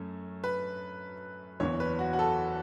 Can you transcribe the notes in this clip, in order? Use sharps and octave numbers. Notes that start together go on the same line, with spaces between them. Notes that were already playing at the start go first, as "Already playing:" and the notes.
Already playing: F#2 A3 C#4
B4
F#1 E2 E3 B3 C#5
B4
F#4
F#4
A4